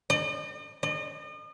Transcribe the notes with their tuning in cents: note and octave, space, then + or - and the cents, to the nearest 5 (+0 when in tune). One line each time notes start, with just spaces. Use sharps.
D#5 -45
D#5 -40